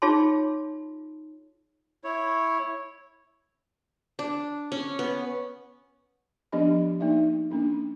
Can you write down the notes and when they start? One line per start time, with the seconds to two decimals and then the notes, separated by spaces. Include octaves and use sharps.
0.02 D#4 F4 G#4 C#5 A5 C6
2.04 E4 C#5
4.19 D4
4.72 C#4
4.99 B3
6.52 F3 B3 D4 G4 D#5 B5
7.00 A#3 D#4 D5 E5
7.51 A#3 C#4 D4